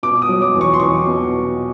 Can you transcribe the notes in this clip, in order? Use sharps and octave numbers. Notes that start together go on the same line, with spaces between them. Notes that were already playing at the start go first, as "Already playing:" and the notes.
B2 D6
D#6
F#3
D6
E2
C#6
C6
E2 C#6
B2